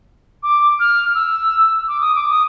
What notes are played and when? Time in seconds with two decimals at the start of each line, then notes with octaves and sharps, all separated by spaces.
0.43 D6
0.80 F6
1.15 E6
1.88 D6
2.01 D#6
2.15 D6
2.29 D#6